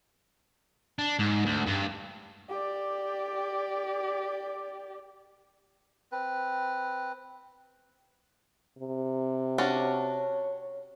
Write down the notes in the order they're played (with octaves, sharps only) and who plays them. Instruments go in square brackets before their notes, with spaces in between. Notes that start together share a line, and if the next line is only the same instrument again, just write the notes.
[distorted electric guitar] D4
G#2
D2
G2
[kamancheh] G4 D5
[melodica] C4 B4
[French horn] C3
[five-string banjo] C#4 D4 F#4 [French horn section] C#5